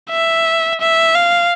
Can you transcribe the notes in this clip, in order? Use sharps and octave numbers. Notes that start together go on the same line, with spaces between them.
E5
E5
F5